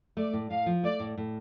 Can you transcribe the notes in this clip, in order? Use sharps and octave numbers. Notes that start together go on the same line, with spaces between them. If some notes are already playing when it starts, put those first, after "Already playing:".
A3 D5
A2
A2 F5
F3
A3 D5
A2
A2